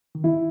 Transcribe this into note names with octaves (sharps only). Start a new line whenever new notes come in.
D#3
E3 E4